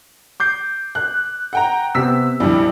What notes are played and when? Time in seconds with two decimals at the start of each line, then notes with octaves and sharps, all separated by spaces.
0.40 D6 G6 C7
0.95 F#6
1.53 F#5 G5 A#5
1.95 C3 B3 G4 E6 B6
2.40 A#1 F2 G3 E4